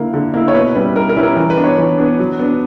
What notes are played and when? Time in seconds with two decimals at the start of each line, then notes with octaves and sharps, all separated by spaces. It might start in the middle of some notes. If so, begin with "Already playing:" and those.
Already playing: D3 A#3 E4
0.14 D3
0.34 A#3 E4
0.48 C#5
0.54 B2 B4
0.75 G3 C#4 E4 B4
0.95 B2 A#4
1.09 A#4
1.17 G3 C#4 E4 B4
1.23 A#4
1.37 E3 A#4
1.50 B4
1.57 B3 D4
1.64 C#5
1.78 E3 B4
1.98 B3 D4
2.19 F#3
2.39 B3 D4